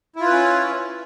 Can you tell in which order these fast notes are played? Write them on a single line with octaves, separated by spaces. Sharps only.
E4 F4 B4 C#4